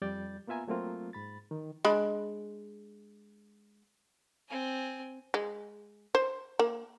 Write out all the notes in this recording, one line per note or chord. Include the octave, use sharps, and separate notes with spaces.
F2 G3 D5 G6 A6
A#3 B3 F4 E5 G#5 A#5
F#3 A3 A#3 C4 F4
G#2 B5 A6
D#3
G#3 D4 B5
C4 G#5
G#3
C5
A#3